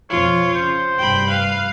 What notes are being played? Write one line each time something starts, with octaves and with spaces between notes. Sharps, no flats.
F2 B2 F3 F4 C#5
C#3 C5
F1 G2 G5 B5
B4 F5